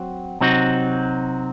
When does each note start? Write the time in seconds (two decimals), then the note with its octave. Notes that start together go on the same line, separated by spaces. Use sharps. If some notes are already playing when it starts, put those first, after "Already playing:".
Already playing: F#3 C4 F#4
0.41 C3 F#3 C4 D#4 F#4